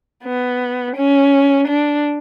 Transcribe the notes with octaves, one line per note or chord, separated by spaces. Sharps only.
B3
C#4
D4